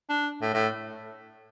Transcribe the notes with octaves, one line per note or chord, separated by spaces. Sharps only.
D4
A2
A2